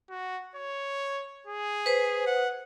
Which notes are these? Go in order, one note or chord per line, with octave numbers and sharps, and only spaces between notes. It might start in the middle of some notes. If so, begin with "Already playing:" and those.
F#4
C#5
G#4
B4 C5
F#5